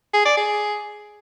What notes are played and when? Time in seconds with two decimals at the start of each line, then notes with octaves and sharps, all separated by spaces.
0.14 G#4
0.25 D5
0.37 G#4